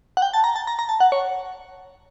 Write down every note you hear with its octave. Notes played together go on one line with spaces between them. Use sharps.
F#5
G5
A5
A#5
A5
A#5
A#5
A5
F#5
C#5